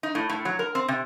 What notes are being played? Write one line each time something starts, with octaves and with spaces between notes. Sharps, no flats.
D#4
A2
A2
F#3
A#4
C4
C3